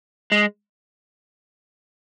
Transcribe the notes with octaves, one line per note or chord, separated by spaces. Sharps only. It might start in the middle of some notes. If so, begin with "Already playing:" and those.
G#3